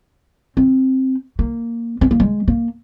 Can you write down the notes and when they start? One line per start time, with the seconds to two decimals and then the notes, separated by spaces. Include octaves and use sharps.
0.57 C4
1.39 A#3
2.01 C4
2.11 A#3
2.20 G#3
2.48 A#3